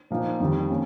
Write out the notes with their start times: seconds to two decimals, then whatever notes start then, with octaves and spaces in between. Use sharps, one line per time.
0.10 A#2 F3 A#3 D#4
0.40 F2 D#3 G3
0.70 A#3 C#4